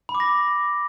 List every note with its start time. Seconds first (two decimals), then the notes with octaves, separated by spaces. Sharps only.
0.09 B5
0.15 D6
0.20 A#6